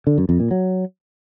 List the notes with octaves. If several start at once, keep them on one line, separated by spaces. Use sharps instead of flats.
D3
F#2
F2
A#2
F#3